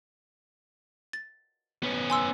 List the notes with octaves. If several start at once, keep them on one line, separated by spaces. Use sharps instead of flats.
A6
B3 C#4
G#5 C6 E6